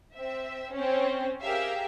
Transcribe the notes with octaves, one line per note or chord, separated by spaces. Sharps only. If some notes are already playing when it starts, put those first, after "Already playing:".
C4 E5
C4 C#4
G4 G#4 A#4 E5 F5